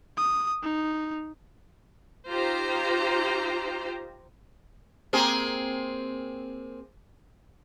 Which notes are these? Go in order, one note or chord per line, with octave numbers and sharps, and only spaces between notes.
D#6
D#4
D#4 F4 G4 C5 A#5
A#3 C4 G#4